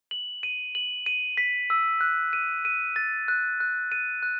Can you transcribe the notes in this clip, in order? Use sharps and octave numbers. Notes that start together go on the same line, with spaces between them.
F#7
D#7
F#7
D#7
B6
E6
F#6
D#7
D#7
A6
F#6
F#6
D#7
F#6